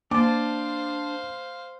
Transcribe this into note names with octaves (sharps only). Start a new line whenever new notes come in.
A#3 D4 C5 F5 A5 D6